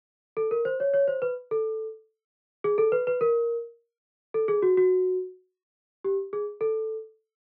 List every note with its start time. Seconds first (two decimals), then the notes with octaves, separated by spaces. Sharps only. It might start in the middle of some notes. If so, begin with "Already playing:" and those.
0.37 A4
0.51 A#4
0.65 C5
0.80 C#5
0.94 C#5
1.08 C5
1.22 B4
1.51 A4
2.64 G#4
2.78 A4
2.92 B4
3.07 B4
3.21 A#4
4.34 A4
4.48 G#4
4.62 F#4
4.77 F#4
6.04 G4
6.33 G#4
6.61 A4